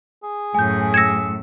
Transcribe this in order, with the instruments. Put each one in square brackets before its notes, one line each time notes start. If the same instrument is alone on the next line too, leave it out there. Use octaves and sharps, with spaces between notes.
[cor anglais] G#4
[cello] F#2 A2 [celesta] G#5 G6
[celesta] E6 C#7 E7 [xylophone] G#6 A#6